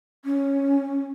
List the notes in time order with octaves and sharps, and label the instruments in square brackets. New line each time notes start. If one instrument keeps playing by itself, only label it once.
[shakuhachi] C#4